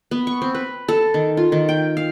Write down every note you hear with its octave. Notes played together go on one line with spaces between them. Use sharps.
B3
C#6
C4
B4
A4
D#3
F4
D#3
G5
F5